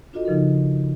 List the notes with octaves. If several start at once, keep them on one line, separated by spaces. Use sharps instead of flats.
D4 F4 F#4 A4 D#5
C#3 F3 D#4 A#4